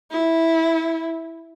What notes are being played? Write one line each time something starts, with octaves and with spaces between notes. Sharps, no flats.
E4